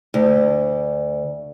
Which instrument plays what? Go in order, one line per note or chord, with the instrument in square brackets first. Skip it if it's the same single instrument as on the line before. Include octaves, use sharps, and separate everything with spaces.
[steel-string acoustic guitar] D2